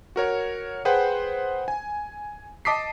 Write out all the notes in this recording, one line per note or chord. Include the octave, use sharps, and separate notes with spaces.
F#4 A#4 C#5
G#4 B4 C5 F#5 G5
G#5
D#5 A5 D6 D#6 B6 C7